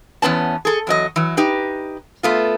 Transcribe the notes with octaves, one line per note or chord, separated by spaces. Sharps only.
E2 G#2 B3 C#4 A5
G#4 A4
E2 F#3 D#5
E3 F#3
D#4 G4 B4
A3 B3 F4